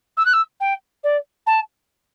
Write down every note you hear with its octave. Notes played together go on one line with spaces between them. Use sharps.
E6
F#6
E6
G5
D5
A5